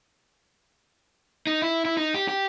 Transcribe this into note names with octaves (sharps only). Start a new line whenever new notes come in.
D#4
E4
E4
D#4
G4
G4